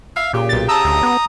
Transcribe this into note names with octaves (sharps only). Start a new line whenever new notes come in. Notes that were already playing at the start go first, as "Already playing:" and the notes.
E5 F5
A#2 C#3 G4
B1 A6
A5 A#5 D#6 E6
D2
B3